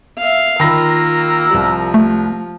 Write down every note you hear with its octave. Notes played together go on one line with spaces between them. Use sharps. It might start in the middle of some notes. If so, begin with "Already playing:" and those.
E5 F5
D#3 A#3 F4 A#5 B5 E6 A#6
C2 F3 G3
A3